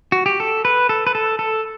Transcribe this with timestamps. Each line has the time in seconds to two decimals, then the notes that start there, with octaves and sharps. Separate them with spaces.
0.12 F#4
0.26 G4
0.40 A4
0.65 B4
0.89 A4
1.07 B4
1.15 A4
1.39 A4